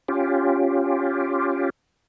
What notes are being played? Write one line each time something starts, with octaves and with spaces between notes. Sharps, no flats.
C#4 F4 G4